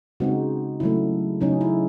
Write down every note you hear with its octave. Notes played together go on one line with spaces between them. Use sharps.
C#3 G#3 C4 D#4 F#4
C#3 F#3 A3 E4
C#3 F#3 C#4 D#4
E4